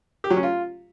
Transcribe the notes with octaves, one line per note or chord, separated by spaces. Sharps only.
G4
F#3
C#4
F4